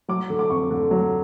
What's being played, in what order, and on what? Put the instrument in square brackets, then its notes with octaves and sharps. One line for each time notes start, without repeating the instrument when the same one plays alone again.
[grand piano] F#3 D6
D3
D6
F2 C#6
D3
F#3